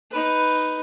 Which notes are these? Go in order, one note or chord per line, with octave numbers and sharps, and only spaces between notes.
D#4 B4